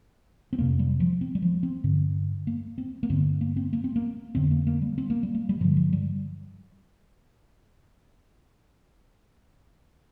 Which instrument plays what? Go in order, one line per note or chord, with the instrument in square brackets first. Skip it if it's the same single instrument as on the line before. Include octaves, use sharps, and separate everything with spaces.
[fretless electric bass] C4
F2 C3 A#3
G3
F3
C4
G3
F3
C4
G2 D3
A#3
C4
A#3
G2 D3 C4
A#3
C4
A#3
C4
A#3
F2 D3 C4
A#3
A#3
G3
C4
A#3
G3
A#3
G3
G2 D3 F3
F3
G3